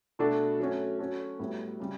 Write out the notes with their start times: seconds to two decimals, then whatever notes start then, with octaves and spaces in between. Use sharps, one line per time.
0.19 B2 A3 D4 F#4 A4
0.59 F#3 A3 C#4 F#4
0.99 F#3 C#4 F#4 A4
1.39 A2 G3 B3 F#4
1.80 C#3 G3